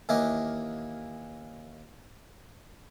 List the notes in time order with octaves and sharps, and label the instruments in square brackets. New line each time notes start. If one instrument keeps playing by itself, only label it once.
[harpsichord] D#2 E3 A#3 E4 D#5 D6